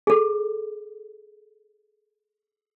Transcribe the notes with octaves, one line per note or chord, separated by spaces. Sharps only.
G#4 A4